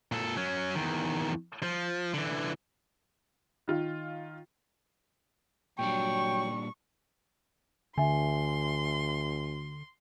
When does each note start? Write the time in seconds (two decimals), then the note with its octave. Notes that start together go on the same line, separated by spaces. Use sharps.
0.12 A#2 A4
0.37 F#3 C#4
0.76 E2 D#3
1.63 F3
2.14 D3 E3
3.68 D#3 F4
5.79 A#2 F#3 G3 D4 G5 C#6
7.98 D2 D3 E5 G#5 C6